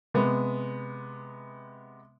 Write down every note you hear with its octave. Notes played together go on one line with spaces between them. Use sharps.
C3 G#3 B3